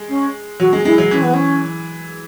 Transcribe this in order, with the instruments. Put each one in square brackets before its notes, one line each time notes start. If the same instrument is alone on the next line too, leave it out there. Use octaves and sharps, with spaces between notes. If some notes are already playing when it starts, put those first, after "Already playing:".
Already playing: [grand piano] G#3
[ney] C#4
[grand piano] F#3 [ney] F#4
[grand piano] G#3
[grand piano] G#3 [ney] E4
[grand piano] F#3
[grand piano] E3 [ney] C#4
[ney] B3
C#4